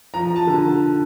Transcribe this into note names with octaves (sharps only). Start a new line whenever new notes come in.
F3 A#5
F3
A5
D3